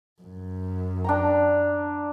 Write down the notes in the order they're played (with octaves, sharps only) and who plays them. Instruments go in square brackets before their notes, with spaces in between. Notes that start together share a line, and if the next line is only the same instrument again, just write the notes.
[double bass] F#2
[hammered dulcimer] D4 G5 A#5